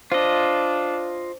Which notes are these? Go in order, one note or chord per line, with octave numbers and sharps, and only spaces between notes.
D4 F4 C5 D#5